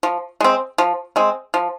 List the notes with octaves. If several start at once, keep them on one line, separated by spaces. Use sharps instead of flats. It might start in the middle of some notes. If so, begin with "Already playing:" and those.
F3
G#3 C4
F3
G#3 C4
F3